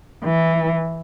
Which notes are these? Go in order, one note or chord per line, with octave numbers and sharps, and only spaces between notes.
E3